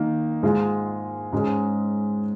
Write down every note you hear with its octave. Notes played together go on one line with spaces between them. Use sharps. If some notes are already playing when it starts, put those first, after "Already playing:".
Already playing: D#3 A#3 D#4
G#2 G#3 F4 G#4
G#2 G#3 C#4 G#4